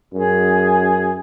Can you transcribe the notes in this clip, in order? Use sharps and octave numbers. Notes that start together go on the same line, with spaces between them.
F#2 G#4